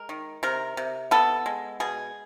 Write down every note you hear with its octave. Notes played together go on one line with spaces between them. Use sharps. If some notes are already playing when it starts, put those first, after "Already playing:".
Already playing: G#3 A#4
D#3
C3 A#4
C3
B3 A4
G#3
B2 G#4